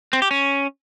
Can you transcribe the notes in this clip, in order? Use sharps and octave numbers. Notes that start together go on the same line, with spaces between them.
C4
G4
C#4